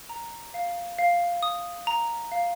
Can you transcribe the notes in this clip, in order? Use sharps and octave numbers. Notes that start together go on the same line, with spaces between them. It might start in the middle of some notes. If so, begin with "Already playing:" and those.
A#5
F5
F5
D#6
A#5
F5